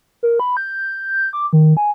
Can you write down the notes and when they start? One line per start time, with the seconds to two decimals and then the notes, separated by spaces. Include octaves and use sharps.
0.23 A#4
0.40 B5
0.57 G6
1.33 D6
1.53 D#3
1.77 G#5